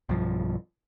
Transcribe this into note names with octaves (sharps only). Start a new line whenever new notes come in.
B1 G2 F3